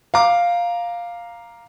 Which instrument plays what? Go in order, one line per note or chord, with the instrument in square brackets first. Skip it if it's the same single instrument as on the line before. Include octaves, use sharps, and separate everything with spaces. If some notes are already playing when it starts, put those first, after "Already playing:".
[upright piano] F5 A#5 D6